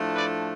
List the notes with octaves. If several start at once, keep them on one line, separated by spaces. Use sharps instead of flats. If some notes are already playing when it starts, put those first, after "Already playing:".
Already playing: A2 F3 A3 D4
B4 D5